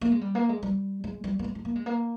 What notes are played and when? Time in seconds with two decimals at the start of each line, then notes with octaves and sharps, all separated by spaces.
0.01 A#3
0.12 G#3
0.21 G3
0.35 A#3
0.49 G#3
0.63 G3
1.04 G#3
1.24 G3
1.39 A#3
1.44 G#3
1.55 G#3
1.65 A#3
1.75 G#3
1.86 A#3